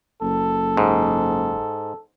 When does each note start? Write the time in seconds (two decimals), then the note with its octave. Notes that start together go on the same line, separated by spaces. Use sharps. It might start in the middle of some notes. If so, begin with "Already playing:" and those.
0.22 F#1 A4
0.77 G#2